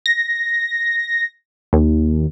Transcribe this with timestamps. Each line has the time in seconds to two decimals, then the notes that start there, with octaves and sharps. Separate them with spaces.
0.06 A#6
1.73 D#2